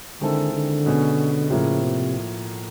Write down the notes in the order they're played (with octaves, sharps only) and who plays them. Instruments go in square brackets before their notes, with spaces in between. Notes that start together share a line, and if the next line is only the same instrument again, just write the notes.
[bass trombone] D3 [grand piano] D#3 G#3 C4 E4 A4
[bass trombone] D3
[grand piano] B2 G#3 C#4
[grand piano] A2 F3 A#3 [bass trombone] C#3
[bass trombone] C3